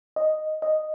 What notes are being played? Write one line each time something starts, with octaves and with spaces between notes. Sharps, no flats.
D#5
D#5